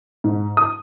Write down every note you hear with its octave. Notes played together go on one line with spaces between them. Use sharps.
G#2
D#6